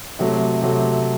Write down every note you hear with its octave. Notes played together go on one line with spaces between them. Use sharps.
C3 F#3 A3
C3 F#3 A3